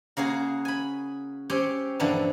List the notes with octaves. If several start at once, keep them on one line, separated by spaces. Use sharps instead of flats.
C#3 A#3 F#4 G#4
G#5 B5
C4 C#4 G4 C#5 G5
G2 A#2 D3 E3 F3